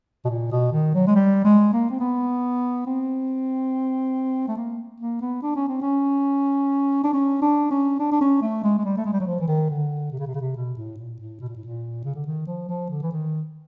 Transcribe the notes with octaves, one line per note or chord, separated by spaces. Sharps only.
B2
A#2
B2
D#3
F#3
G#3
G3
G#3
A#3
C4
B3
C4
A3
A#3
A#3
B3
D4
C#4
C4
C#4
D4
C#4
D4
C#4
D4
D4
C#4
A3
G#3
G#3
G3
A3
G#3
G3
F#3
F3
E3
D#3
D3
C3
C#3
C3
C#3
C3
B2
A2
A#2
A2
B2
A#2
A2
A#2
C#3
D3
D#3
F3
F3
D3
E3
D#3